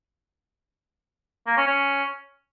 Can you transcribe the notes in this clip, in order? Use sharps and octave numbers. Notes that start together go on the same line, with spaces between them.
A#3
C#4
C#4